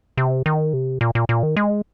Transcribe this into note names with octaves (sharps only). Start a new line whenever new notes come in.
C3
D#3
C3
A#2
A#2
A#2
D#3
G#3